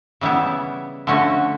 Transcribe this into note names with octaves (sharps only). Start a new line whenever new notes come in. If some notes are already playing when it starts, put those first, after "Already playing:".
C#3 E3 G3 B3 E4
D3 F3 A3 C#4 F#4